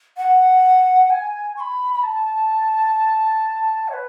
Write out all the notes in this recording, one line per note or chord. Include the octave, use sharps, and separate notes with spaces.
F#5
G#5
C#6
B5
B5
A5
C#5
B4